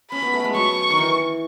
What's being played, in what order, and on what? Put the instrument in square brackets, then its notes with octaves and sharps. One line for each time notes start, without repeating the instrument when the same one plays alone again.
[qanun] C#4 [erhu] B5
[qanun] B3
A3
G#3
[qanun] F#3 [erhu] C#6
[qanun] D#3
E3